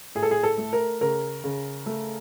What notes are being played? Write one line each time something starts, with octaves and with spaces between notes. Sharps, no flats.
A2 G#4
A4
G#4
A4
A3
A#4
C#3 A#4
C#3
A3